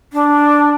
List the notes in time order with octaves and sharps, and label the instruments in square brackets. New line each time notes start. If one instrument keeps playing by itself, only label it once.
[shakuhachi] D4